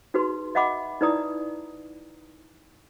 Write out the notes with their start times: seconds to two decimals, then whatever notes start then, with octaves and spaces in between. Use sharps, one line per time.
0.14 D#4 F#4 G#4 B4 C6
0.55 D#5 E5 F#5 B5 D6
1.01 D#4 E4 B4 D5 A#5 D#6